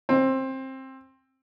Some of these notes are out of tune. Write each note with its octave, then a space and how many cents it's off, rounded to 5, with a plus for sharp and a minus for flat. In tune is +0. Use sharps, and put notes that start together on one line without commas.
C4 +20